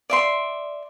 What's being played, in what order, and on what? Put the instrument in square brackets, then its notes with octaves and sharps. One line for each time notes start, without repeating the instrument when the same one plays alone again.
[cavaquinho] D5 E5 C6